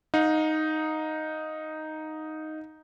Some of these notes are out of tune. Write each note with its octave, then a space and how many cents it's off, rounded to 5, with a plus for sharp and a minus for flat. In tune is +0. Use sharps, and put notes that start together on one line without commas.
D#4 +0 F5 +40